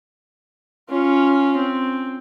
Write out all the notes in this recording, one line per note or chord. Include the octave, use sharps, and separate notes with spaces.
C#4 F4
C4